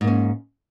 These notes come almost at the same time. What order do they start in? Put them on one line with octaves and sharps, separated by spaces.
G#2 A#3 C#4